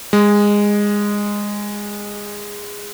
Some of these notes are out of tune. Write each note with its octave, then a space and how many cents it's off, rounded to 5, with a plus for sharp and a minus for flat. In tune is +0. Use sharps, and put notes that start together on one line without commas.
G#3 -15